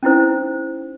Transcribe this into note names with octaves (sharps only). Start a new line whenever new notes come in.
C#4 D#4 E4 C5